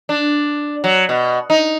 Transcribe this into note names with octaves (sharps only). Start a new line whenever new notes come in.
D4
F#3
B2
D#4